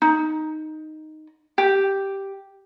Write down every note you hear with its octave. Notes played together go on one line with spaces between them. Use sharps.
D#4
G4